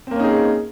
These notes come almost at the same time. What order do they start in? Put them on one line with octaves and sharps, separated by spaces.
C4 A#3 C#4 D#4 G#4